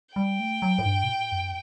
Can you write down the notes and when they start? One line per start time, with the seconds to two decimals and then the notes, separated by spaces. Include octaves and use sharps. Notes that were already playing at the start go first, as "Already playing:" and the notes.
0.16 G3 G5
0.40 A3
0.62 F#3
0.79 A2
0.85 G2
1.03 B2
1.08 A2
1.32 F#2